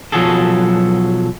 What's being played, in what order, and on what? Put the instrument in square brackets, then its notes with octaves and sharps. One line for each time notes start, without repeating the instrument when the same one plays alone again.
[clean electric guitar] B1 F3 F#3 F#4 G#4 A4